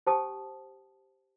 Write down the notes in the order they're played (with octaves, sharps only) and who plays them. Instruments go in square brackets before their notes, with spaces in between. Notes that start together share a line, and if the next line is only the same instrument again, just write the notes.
[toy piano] G4 C5 G5 A5 D#6